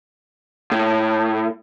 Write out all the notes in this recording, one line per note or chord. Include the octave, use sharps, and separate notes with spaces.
A2